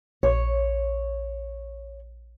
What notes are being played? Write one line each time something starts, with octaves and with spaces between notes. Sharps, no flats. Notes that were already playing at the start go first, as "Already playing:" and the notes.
A#1 C#5